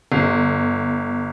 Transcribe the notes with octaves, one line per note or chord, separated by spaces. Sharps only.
G1